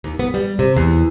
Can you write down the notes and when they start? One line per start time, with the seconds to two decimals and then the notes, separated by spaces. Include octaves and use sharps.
0.04 D#2
0.19 B3
0.34 G3
0.59 C3
0.77 E2